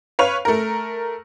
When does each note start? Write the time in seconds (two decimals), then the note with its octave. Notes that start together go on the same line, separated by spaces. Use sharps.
0.19 B4 C#5 F5 F7
0.45 A3 A#4